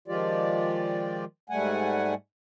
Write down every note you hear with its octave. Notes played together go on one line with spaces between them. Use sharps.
D#3 F3 G#3 F4 G4 D5
G#2 G3 A3 F#5 G#5